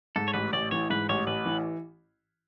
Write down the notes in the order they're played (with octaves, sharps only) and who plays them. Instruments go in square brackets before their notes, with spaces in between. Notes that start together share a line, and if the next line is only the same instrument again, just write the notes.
[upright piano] G#2 [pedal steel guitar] A4
[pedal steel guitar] C#5
[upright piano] A1 [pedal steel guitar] B4
[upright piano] A1 [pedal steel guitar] D5
[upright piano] E3 [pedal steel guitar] C#5
[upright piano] G#2 [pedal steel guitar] B4
[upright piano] A1 [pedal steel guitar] C#5
[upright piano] A1 [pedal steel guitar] B4
[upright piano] E3